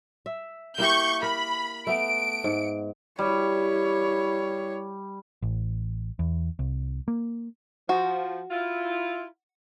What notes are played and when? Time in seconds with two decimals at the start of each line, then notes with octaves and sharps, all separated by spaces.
0.26 E5
0.78 A#3 E4 G4 C#6 G6
1.23 A#4 B5
1.87 A3 B3 D7
2.44 G#2
3.19 G3 E4 C#5
5.42 A1
6.19 E2
6.59 C2
7.08 A#3
7.89 F3 F#4
8.51 E4 F4